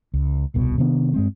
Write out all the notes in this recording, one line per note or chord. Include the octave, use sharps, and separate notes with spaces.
C#2
D#1 C2 B2
C3 D#3 B3 D4
G2 G#3 C4